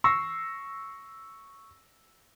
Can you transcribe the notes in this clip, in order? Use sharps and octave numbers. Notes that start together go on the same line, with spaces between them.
C#6 E6 A#6 C7